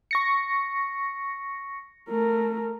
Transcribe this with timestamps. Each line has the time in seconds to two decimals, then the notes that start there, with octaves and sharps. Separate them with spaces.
0.11 C#6 A#6 C#7
2.09 A3 A#4